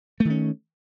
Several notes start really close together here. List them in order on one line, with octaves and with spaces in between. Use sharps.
A3 D#3 C#4